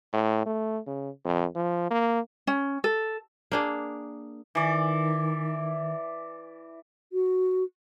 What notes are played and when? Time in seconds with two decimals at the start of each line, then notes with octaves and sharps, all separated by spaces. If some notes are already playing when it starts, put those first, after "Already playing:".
0.13 A2
0.46 A3
0.87 C#3
1.24 F2
1.55 F3
1.90 A#3
2.47 C#4
2.84 A4
3.52 A#3 D4 G#4
4.55 D#3 E3 D5
7.13 F#4